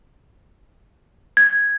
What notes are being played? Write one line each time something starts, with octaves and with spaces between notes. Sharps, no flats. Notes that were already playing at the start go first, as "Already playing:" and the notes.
G#6